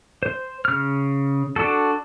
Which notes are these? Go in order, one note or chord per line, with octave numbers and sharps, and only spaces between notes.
C5
C#3 F6
D4 F#4 A4